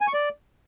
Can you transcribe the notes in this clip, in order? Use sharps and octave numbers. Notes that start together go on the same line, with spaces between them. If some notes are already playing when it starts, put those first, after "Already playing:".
G#5
C#6
D5